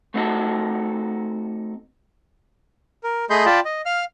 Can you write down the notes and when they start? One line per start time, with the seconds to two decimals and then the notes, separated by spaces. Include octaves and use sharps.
0.14 A3 B3 C4 D#4 F#4 A4
3.04 A#4
3.30 A3 G#4 D#5 B5 C6 G6
3.46 F4 D5 G5 A5 B5
3.65 D#5
3.86 F5 F6